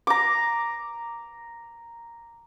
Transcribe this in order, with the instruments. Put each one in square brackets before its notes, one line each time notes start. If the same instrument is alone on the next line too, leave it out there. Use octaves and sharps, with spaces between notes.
[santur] A#5 D6